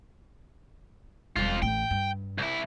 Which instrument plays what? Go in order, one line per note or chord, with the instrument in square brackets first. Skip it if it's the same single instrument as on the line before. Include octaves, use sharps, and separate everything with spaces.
[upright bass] E1 G3 [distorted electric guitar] F2 F4
[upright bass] A1 A2 [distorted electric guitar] G5
[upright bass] G2
[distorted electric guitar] C2 E4